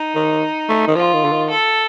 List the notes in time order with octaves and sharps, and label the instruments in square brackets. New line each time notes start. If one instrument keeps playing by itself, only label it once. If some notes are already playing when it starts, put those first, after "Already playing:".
Already playing: [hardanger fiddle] D#4
[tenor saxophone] D#3
A3
D#3
[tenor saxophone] F3 [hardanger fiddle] F4
[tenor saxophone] D#3
D3
D#3
[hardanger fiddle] A4